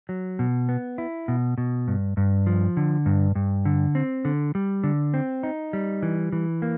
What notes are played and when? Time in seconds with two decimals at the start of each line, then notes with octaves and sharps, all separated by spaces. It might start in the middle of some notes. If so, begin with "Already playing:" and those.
0.09 F#3
0.39 B2
0.69 B3
0.98 E4
1.28 B2
1.58 B2
1.88 G2
2.17 G2
2.46 F3
2.77 D3
3.06 G2
3.35 G2
3.65 D3
3.95 C4
4.25 D3
4.55 G3
4.84 D3
5.14 C4
5.43 D#4
5.73 G3
6.02 E3
6.32 E3
6.62 A#3